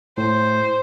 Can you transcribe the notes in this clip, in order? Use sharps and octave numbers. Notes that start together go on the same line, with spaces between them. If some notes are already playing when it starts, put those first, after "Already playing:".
A2 C5